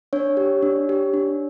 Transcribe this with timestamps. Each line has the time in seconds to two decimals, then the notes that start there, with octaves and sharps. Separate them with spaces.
0.13 D4 C#5
0.37 G4
0.62 D4
0.89 G4
1.14 D4